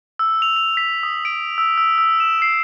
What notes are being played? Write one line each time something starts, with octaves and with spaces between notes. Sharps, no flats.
E6
F7
F7
B6
D#6
D7
E6
E6
E6
E7
C7